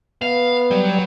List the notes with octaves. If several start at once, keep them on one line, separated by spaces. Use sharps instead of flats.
B3 F5
F#3 G3